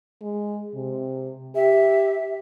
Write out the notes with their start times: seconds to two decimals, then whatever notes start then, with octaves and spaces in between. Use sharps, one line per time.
0.21 G#3
0.74 C3
1.55 G4 E5